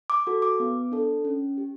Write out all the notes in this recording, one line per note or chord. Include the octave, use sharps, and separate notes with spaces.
D6
F#4 A4
D6
B3
D4 A4
C#4
G4